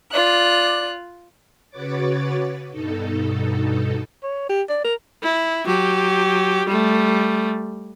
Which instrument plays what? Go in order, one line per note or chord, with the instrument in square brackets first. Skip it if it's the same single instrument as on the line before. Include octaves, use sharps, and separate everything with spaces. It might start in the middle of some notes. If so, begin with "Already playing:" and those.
[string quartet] F4 F#6 [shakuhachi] D5
[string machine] C#3 F#4 B4 C#5 D6 A6
G2 B2 D#4 A4
[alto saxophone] C#5
G4
D5
A#4
[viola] E4
F#3 G4
G3 A3